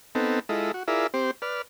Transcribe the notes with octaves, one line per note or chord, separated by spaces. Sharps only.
B3 C4 D#4 A4
G#3 E4 F4 A4 D#5
F#4
E4 F4 G#4 A#4 D5 E5
C4 G4 C5
B4 D5 F6